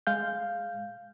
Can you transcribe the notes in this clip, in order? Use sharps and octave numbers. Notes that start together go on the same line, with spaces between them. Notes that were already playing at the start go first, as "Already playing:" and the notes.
G#3 F5 G6